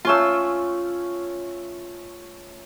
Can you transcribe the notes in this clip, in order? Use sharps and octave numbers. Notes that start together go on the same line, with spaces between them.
A3 C#4 F4 C6 E6